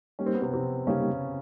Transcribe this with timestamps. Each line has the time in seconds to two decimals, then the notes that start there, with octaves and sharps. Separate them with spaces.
0.19 G3 A#3 C#4 D#4 G4
0.26 C4
0.34 B3
0.42 C3 C4
0.53 C3 C4
0.87 C#3 G3 A#3 C#4 D#4 G4